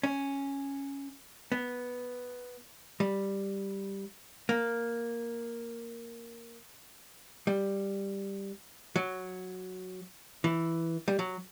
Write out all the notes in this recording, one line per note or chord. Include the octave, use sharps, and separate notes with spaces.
C#4
B3
G3
A#3
G3
F#3
E3
G3
F#3